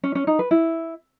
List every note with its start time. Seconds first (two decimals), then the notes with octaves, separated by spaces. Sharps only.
0.04 C#4
0.15 C#4
0.27 D#4
0.39 B4
0.51 E4